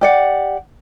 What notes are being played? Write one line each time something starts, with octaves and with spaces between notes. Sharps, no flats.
G4 D5 F#5